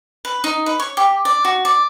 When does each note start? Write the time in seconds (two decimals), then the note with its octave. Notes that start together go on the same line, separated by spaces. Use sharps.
0.25 B4
0.44 D#4
0.66 B4
0.80 C#5
0.97 G4
1.25 D5
1.45 F#4
1.65 D5